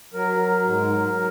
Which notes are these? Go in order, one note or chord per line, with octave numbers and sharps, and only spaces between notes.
F#3 A#4
F#3
G#2
F#3
F#3